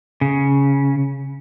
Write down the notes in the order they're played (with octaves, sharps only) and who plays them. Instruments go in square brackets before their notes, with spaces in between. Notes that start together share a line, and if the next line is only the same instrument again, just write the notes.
[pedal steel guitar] C#3